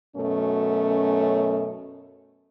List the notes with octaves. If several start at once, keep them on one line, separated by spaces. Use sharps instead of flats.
F#2 B2 A3 C#4